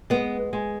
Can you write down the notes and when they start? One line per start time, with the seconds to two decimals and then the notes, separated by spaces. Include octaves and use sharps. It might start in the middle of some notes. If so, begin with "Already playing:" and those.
0.10 G#3 B3
0.53 G#3